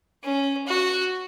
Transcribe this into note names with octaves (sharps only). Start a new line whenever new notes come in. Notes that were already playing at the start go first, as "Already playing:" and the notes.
C#4
F#4